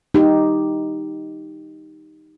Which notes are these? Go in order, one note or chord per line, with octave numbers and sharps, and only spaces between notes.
D#4 G4